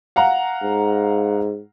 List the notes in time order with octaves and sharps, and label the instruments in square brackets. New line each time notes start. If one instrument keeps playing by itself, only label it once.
[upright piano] F5 F#5 A#5
[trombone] G#2